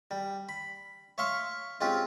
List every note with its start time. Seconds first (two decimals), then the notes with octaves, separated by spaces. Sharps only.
0.11 G3
0.49 B5
1.18 C#5 E5 F5 C6 C#6
1.81 G#3 C4 C#4 F4 G4